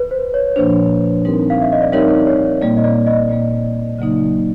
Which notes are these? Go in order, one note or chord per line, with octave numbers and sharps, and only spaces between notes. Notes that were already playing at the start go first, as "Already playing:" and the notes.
Already playing: B4
C5
C#5
A#2 F3 A#3 D4 C5
G3 C4 D#4 G4 A#4
F5
E5
D#5
D5
G3 C4 D#4 G4 A#4 C#5
C#5
A#2 G3 A#3 D5
D#5
D5
D#5
A#2 G3 A#3
C#3 F#3 A#3 D#4